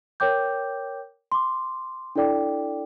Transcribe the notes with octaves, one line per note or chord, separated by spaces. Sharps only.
A#4 C#5 G5 D6 G6
C6 D6
D4 E4 A4 D5 G5 D6